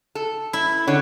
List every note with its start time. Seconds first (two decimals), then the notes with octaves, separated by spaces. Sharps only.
0.15 A4
0.53 E4
0.88 D3 C#4